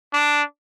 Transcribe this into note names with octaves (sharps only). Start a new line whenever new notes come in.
D4